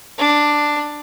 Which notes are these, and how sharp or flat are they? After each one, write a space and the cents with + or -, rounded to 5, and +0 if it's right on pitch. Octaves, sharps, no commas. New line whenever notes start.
D4 +5